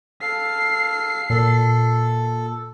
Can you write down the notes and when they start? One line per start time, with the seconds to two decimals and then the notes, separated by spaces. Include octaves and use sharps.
0.21 A4 F5 C7
1.30 A#2 A4